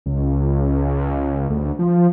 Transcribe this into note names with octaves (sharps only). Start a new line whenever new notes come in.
C#2
D2
F3